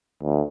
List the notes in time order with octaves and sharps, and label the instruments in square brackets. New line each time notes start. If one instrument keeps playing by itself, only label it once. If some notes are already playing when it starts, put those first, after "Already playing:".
[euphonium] D2